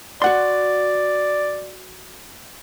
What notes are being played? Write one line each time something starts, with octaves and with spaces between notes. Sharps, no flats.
F#4 D5 F#5 C6